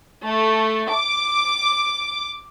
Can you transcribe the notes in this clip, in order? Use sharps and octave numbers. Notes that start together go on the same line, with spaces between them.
A3
D6